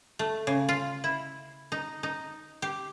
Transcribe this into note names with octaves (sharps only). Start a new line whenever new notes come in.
A3
C#3
F4
E4
D#4
D#4
G4